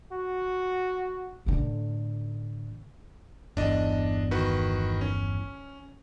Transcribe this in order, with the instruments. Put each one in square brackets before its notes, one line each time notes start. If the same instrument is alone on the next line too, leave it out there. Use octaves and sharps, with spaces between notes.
[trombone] F#4
[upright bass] A2 D3
[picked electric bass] G1 E2 [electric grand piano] D4 D#5
[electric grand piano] D#3 F#4 B4
C#4